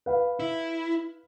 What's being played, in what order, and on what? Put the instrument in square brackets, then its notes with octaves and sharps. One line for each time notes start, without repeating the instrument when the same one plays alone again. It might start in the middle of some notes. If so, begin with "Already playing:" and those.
[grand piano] B4 F5
[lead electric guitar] E4